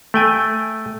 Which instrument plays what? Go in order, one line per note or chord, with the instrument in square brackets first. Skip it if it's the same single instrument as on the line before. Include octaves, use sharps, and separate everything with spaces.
[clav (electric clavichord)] A3 G5 G#5